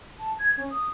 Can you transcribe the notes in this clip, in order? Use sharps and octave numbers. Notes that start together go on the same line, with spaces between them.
A5
G#6
C#4
D#6